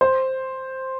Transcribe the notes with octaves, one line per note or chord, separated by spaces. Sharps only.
C5